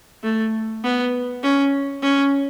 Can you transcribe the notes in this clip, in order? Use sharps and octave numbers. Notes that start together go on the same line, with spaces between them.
A3
B3
C#4
C#4